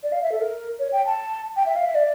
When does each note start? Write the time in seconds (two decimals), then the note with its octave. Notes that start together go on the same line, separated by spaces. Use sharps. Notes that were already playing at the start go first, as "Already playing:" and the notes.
0.03 D5
0.12 F5
0.23 E5
0.32 A4
0.41 A#4
0.79 C#5
0.92 G5
1.06 A5
1.56 G5
1.66 E5
1.76 F5
1.85 E5
1.95 D5